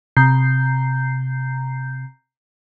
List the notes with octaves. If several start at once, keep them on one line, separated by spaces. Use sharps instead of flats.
C3 A#5 G6 C7